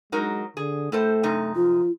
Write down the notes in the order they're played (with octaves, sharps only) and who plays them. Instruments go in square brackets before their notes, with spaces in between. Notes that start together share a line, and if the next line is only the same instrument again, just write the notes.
[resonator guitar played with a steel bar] F#3 D#4 A#4 [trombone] G#3
[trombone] D3 [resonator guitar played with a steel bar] G#4
[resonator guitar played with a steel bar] A2 A4 C5 [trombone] A3
[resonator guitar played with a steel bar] F#2 C3 D#4
[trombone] F3 [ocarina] F4